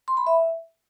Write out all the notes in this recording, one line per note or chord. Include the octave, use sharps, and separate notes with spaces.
C6
B5
E5